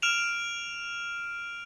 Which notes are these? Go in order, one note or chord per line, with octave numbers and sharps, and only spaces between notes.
F6 D7 E7 F7